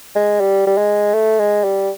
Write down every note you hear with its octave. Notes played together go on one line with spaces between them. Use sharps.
G#3
G3
G3
G#3
A3
G#3
G3